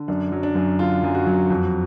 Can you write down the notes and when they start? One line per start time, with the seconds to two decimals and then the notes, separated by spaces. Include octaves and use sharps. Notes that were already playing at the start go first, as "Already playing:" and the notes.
Already playing: D3
0.08 F#2 D4
0.32 F#3
0.43 D4
0.55 F#2
0.79 D3 F4
1.03 F#2
1.15 F#4
1.27 F#3
1.50 F2